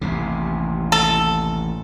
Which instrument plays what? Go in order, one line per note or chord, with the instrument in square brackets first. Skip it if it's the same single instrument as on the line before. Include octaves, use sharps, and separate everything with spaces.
[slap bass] A1 D#2 C3
[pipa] A4